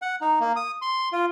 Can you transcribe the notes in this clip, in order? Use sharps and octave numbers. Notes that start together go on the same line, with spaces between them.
F#5
D#4
A#3
D#6
C6
F4